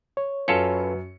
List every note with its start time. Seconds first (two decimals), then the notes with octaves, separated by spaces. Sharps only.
0.17 C#5
0.48 F#2 C#4 F4 A4 B4 C#7